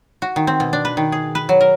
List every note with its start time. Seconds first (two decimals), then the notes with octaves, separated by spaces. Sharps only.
0.22 F#4
0.36 D#3
0.47 C4
0.60 B2
0.73 D4
0.85 B4
0.97 D#3
1.12 G#4
1.35 B4
1.49 F#3
1.61 A#4